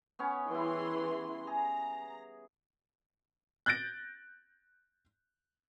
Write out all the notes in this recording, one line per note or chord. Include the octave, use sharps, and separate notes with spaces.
B3 C#4 C#5
E3 G3 E4 G#4 C6
G#4 A#5
F#6 G6 A6 A#6 D7